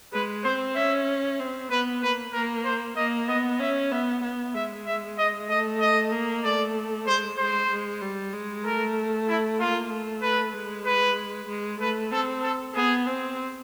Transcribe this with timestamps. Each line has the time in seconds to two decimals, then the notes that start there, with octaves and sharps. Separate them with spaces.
0.13 G#3 B4
0.44 C4 C5
0.75 C#4 E5
1.39 C4
1.70 B3 B4
2.02 A#3 B4
2.33 A#3 A#4
2.65 C5
2.96 A#3 D#5
3.28 B3 D#5
3.59 C#4 E5
3.92 B3 E5
4.23 B3
4.55 G#3 E5
4.86 E5
5.17 D#5
5.49 A3 D#5
5.80 D#5
6.12 A#3
6.44 A3 D5
7.07 G#3 C5
7.38 G#3 C5
7.69 G#3
8.01 G3
8.33 G#3
8.64 A3 A#4
9.28 E4
9.59 A#3 F4
9.90 A3
10.22 B4
10.54 G#3
10.85 B4
11.48 G#3
11.80 A3 B4
12.11 C4 A4
12.42 A4
12.74 B3 G#4
13.06 C4